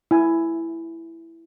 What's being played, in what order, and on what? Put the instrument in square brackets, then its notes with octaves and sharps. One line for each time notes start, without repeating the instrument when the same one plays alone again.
[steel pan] E4 G#5